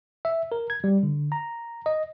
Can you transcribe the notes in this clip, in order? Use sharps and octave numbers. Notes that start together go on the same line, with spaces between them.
E5
A#4
G#6
G3
D3
A#5
D#5